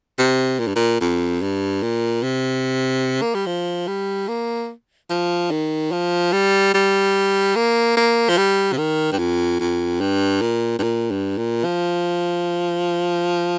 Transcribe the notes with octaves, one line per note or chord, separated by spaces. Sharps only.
C3
A#2
G2
A#2
F2
G2
A#2
C3
A#3
G3
F3
G3
A#3
F3
D#3
F3
G3
G3
A#3
A#3
F3
G3
C3
D#3
G2
F2
F2
G2
A#2
G2
A#2
G2
A#2
F3